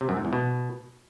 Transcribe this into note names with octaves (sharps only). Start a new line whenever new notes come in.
C3
F#2
G#2
E2
B2